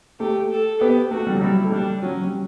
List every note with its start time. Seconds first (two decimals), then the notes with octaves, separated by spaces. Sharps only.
0.20 A3 G4
0.51 A4
0.80 B3 G4
1.11 A3 F#4
1.27 G3
1.34 F#3
1.41 G3 E4
1.64 A3
1.72 G3 D4
2.02 F#3 C#4
2.24 G3